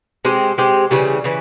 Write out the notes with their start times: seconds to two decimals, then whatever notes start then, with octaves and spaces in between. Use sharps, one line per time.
0.25 G#3 C4 G4
0.58 G#3 C4 G4
0.91 C#3 E3 G3
1.24 C#3 E3